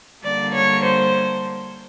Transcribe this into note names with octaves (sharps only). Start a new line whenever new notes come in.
D3 G3 A#3 D5
C#5
C5